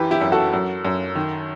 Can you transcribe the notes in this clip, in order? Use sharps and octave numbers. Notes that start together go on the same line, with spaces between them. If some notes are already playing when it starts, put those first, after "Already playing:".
Already playing: F#2 E3 G4 B4
E4 G4
F#2
F#4 A4
F#2
F#2
D#3